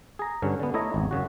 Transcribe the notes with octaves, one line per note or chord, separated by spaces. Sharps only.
G#4 A#5
G2 D3 C#4
D3 B3
A3 E4 C#5 D#5 A#5
G#1 E2
F#2 C#3 F#4